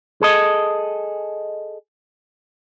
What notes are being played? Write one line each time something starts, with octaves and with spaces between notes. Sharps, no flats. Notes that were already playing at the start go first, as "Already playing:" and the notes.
G#4 A4 D#5